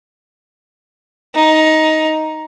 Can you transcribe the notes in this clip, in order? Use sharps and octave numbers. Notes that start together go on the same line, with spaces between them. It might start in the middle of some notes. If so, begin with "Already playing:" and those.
D#4